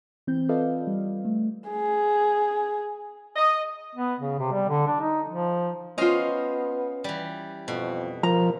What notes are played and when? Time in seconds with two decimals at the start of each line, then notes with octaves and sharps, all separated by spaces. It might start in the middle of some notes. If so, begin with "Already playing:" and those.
0.27 E3 C4 G6
0.49 F4 A4 B4 D5 D#5 F5
0.87 G3
1.25 A3
1.70 G#4
3.36 D#5
3.95 B3
4.20 C#3
4.39 C3
4.52 G3
4.69 D3
4.87 D4
5.01 D#4
5.28 F3
5.98 B3 C#4 F4 C5 D#5 F5
7.04 E3 G3
7.68 F2 B2
8.23 F3 A#4 A#5